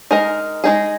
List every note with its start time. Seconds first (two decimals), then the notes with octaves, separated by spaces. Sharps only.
0.11 G#3 D#4 A#4 D#5
0.64 G#3 D#4 G#4